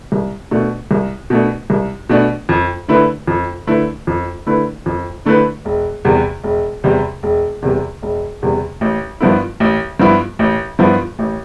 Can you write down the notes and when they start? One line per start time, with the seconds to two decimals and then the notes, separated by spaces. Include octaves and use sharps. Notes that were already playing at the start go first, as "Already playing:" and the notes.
0.12 C2
0.51 B2 A3 D4
0.91 C2
1.30 B2 A3 D4
1.70 C2
2.09 B2 A3 D4
2.49 F2
2.88 D3 A3 E4 B4
3.27 F2
3.67 D3 A3 E4 B4
4.07 F2
4.46 D3 A3 E4 B4
4.86 F2
5.25 D3 A3 E4 B4
5.65 E1
6.05 E2 C3 G3
6.44 E1
6.84 E2 C3 G3
7.23 E1
7.62 E2 C3 G3
8.02 E1
8.42 E2 C3 G3
8.81 A1
9.21 G2 F3 B3 E4
9.60 A1
10.00 G2 F3 B3 E4
10.39 A1
10.79 G2 F3 B3 E4
11.19 A1